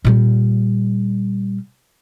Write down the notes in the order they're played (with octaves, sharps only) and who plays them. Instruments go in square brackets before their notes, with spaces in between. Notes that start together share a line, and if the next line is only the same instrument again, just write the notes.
[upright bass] A#2 G3